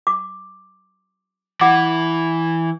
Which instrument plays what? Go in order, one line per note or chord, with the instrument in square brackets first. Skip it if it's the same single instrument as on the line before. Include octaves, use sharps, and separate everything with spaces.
[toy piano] D6
[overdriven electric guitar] E3 [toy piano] F#5 D6